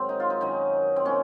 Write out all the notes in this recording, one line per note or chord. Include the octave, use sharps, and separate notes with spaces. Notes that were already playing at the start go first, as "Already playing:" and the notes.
Already playing: G#2 D#3 F#3 C4
D#4
F4
D#4
F#2 D#3 F#3 D#4
C4
A#2 C#4